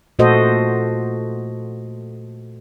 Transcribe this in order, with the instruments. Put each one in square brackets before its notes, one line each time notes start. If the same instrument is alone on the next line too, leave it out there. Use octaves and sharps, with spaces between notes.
[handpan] A#2 A3 F#4 A4 C5 D#5